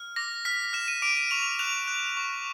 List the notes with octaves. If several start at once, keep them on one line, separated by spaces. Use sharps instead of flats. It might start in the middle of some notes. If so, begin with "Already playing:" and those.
Already playing: F6
D6 A#6
F6 B6
F6 E7
D#7
D6 D7
D#7
C#6 F7
F#6 F7
F#6
C#6